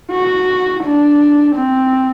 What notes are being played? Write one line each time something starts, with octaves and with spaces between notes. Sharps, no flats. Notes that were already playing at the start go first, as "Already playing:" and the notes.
F#4
D4
C4